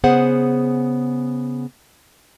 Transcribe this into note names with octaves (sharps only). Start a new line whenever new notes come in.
C#3 B3 G#4 C5 F#5